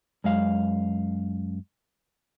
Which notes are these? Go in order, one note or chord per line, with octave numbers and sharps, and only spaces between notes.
F#2 G#3 F5